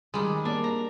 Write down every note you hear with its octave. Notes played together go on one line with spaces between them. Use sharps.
D#3 G3 G#3
A#3 D4 D5
A#5